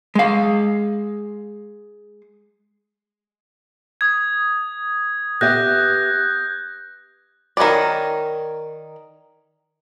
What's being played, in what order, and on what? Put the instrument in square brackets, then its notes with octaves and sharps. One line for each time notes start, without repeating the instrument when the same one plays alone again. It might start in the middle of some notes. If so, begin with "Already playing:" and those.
[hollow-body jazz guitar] G#3 F5
[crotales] D#6 G#6
[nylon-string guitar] B3 G4 E5 [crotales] F#6 G6 A#6
[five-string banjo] D#3 A#4 B4 C#5 D5